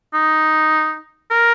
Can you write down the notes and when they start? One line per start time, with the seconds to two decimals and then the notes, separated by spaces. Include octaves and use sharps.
0.14 D#4
1.31 A#4